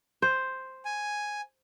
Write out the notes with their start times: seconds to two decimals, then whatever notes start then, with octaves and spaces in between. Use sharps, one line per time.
0.22 C5
0.85 G#5